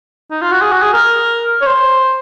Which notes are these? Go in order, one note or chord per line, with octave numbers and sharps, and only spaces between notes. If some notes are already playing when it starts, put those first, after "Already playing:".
D#4
F4
F#4
G#4
F#4
G#4
A#4
C#5
C5